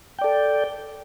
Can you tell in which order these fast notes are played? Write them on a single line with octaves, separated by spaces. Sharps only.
G5 D5 A4